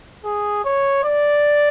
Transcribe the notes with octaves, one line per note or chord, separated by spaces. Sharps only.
G#4
C#5
D5